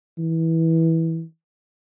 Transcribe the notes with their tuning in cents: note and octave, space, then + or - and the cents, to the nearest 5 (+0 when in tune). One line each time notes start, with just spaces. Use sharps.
E3 -15